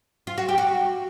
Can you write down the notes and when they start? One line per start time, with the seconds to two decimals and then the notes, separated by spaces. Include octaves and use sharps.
0.27 F4
0.38 F#4
0.49 G4
0.58 F#4